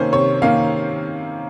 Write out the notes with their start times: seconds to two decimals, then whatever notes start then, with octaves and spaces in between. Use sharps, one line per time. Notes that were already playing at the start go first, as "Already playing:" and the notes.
Already playing: C3 D#3 A#3 C#4 C5
0.13 C3 C#5
0.42 D#3 A#3 C#4 F5